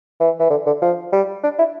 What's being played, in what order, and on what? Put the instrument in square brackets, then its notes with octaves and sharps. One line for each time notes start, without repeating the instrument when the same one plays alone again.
[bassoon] E3
E3
D3
D3
F3
G3
D4
E4